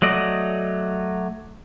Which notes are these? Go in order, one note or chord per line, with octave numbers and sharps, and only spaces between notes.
F#3 A3 D5 D#5